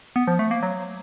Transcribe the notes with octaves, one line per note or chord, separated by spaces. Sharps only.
B3
F3
A3
A#3
F#3